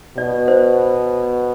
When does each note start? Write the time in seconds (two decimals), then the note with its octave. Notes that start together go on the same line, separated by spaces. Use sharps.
0.17 B2 D5
0.48 C5